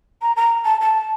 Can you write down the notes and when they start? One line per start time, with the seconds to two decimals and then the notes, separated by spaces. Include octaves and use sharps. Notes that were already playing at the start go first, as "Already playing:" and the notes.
0.22 A#5
0.36 A#5
0.65 A5
0.81 A5